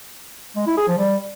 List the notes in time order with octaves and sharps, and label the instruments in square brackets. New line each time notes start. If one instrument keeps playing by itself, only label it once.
[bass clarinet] G#3
E4
G#4
F3
G3